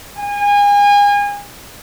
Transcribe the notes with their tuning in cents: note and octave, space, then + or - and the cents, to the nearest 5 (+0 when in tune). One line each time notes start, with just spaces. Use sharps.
G#5 -30